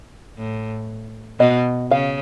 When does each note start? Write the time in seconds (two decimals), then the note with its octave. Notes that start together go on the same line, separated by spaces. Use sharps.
0.37 A2
1.39 B2 D#5
1.91 C#3 F5